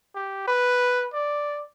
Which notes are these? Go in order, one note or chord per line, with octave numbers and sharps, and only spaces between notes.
G4
B4
D5